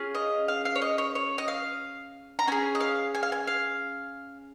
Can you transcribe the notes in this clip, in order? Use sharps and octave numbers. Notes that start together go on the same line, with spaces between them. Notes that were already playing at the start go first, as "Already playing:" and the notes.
Already playing: C#4 F4 G#4
D#5
F5
F5
C#5
D#5
C#5
C#5
D#5
F5
A#5
C#4 G#4 G#5
D#5
F5
G#5
F5
G#5
F5